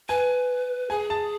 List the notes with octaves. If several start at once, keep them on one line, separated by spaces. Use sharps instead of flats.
B4 G#5
G#4 G#5
A5